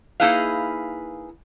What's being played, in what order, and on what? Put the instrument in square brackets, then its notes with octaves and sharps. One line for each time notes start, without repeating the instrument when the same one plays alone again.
[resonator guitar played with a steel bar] A#3 D#4 E4 G#4 B4 F5